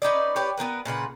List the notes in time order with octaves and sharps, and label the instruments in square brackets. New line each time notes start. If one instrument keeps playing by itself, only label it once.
[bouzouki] C#4 D#4 B4 D5
G4 B4 C#5 D5
B3 C4 A#4 B4
A#2 C#3 B4 F#5